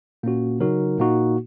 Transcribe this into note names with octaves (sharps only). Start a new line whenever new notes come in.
A#2 A#3 C#4 F#4
C#3 F#3 D#4 F#4 A#4
A#2 A#3 D#4 F#4